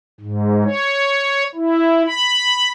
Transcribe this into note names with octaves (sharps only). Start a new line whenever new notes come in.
G#2
C#5
E4
B5